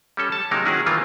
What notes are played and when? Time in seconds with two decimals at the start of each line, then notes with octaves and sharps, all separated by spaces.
0.17 G3 C#4 A4
0.32 A5
0.51 C3 F#3 G#3 A#3 D#4 A#4
0.65 D#3 C#4 E4 F#4 G#4
0.86 D#3 E3 A#3 C4 F4